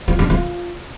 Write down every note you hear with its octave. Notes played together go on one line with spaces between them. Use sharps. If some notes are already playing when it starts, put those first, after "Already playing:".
F4
D4
F4